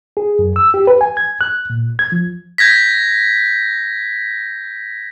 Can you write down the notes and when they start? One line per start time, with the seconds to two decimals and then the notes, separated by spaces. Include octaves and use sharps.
0.17 G#4
0.39 F#2
0.56 E6
0.74 G4
0.87 B4
1.01 G#5
1.17 G#6
1.41 F#6
1.70 A#2
1.99 G#6
2.12 F3
2.58 G6 G#6 A#6 B6